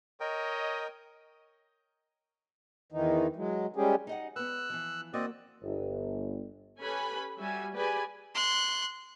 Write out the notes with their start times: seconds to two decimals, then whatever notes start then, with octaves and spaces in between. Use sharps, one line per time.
0.20 A#4 C#5 D#5 G5
2.92 E2 D#3 E3 D#4
3.36 F#3 G#3
3.76 G3 G#3 C#4 G4 G#4
4.07 D#4 D#5 F#5
4.36 B3 B4 E6 F#6
4.70 E3 F3
5.14 A#3 C4 F#4 D5 D#5
5.63 G1
6.80 C#4 G4 A4 B4 G#5 B5
7.38 G3 F#4 E5 G#5
7.76 G4 G#4 B4 D5 G#5
8.34 C6 F#6